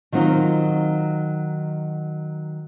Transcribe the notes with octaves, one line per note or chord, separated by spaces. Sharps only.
D#3 F#3 C4 D#4 F4